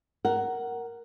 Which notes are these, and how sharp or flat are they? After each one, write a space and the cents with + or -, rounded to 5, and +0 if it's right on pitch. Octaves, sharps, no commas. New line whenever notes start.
A#4 +0 F#5 +15